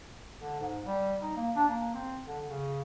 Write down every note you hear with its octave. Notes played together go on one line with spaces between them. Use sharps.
D3
G#2
G3
D#4
A#3
D4
A#3
C4
D3
C#3